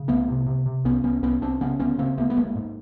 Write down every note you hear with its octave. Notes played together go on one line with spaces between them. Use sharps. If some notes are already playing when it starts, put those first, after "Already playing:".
Already playing: C#3
C2 A3 B3
C3
C3
C3
C2 B3 C#4
C2 B3 C#4
C2 B3 C#4
C2 C4 D4
C#3 B3 C#4
D2 B3 C#4
C#3 A#3 C4
D2 A3 B3
B3
G#1 G#3 A#3
G#2